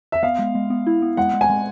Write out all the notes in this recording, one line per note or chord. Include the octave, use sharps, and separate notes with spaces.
E5
B3 F5
G#3
G#3
B3
E4
B3
G#3 F#5
G#3
G#5
G#3